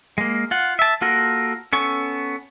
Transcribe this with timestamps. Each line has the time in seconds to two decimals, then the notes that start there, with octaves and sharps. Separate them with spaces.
0.18 G#3 A#3
0.51 F4 F#5
0.79 E5 A5
1.01 A#3 F4 F#4 A4 A#4
1.73 B3 C#4 A4 C#6